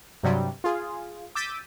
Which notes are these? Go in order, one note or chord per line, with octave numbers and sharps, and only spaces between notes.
G2 C3 F#3 G3
F4 G#4
D6 E6 G6 A6 B6 D#7